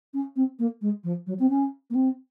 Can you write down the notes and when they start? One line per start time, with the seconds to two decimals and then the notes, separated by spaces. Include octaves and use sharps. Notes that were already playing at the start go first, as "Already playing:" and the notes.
0.14 C#4
0.36 C4
0.59 A#3
0.81 G#3
1.04 F3
1.27 F#3
1.39 C4
1.50 C#4
1.90 A#3
1.95 C4